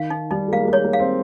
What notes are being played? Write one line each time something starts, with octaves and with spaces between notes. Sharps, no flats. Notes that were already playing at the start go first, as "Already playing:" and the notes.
Already playing: D#3 F5
D#4
G3 D#4
G#3
A#3 F5
G#3
A#3 C#5
A#3
F5
C4